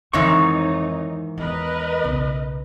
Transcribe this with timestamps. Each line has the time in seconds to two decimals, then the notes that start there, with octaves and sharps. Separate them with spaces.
0.13 F2 G#2 D#3 E3 D#4 C#5 C#6
1.38 E2 A#4 B4 D#5
2.04 B1 C#3